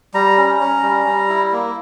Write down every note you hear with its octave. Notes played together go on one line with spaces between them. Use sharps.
G3 A#5
C#4
C#4
G3
G3
E4
A#3